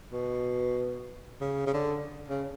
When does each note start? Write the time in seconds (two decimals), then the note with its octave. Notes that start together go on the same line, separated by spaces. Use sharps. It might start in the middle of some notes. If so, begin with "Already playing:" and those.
0.11 B2
1.41 C#3
1.67 C#3
1.74 D3
2.28 C#3